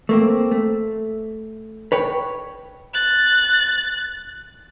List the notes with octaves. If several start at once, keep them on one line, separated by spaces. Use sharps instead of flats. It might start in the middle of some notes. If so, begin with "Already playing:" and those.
A3 A#3 C4
A3
B4 C#5 G5
F#6 A6